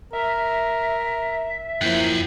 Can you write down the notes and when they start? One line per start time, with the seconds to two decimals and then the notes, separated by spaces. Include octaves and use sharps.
0.13 A#4 E5
1.81 F#2 F3 A#3 E4 G5